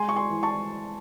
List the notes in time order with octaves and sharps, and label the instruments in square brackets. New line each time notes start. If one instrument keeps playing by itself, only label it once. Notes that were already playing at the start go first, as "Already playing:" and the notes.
Already playing: [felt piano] G#3 G#5 C6
C#6
G#5 C6
E3
A5 C#6